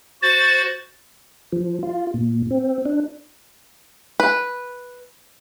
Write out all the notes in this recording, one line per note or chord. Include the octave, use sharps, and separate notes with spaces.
F#4 C5 A6
F3
F4
A#2
C4
D4
B4